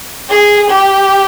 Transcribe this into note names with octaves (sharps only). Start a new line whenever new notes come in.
G#4
G4